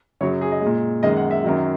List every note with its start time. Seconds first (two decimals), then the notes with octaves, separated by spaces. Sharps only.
0.21 F#2 C#3 F#3 C#5
0.41 G#4
0.52 D#5
0.61 A#2 G#3
1.03 F#2 D#3 G#3 D#5
1.17 F#5
1.31 E5
1.44 F#2 D#3 F#3